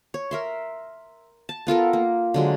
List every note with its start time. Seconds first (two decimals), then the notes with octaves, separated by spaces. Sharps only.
0.14 C#5
0.31 A#4 E5 C6
1.49 A5
1.67 B3 F4 A4 A#4
1.93 A#3
2.34 D3 F#3 G#3